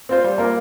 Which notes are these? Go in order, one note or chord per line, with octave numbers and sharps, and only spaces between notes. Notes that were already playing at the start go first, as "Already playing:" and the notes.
C4 F4 C5
G3
A#3 F4 A#4